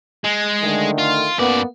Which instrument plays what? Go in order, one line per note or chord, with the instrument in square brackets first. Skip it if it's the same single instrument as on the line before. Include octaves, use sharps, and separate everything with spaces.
[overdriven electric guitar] G#3
[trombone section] D3 D#3 A3
[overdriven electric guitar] F4
[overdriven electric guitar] F#2 D5 [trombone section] A#3 B3